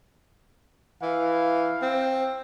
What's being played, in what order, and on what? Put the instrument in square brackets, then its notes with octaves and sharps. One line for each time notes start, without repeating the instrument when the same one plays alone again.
[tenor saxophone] E3 [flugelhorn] F5
[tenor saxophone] C4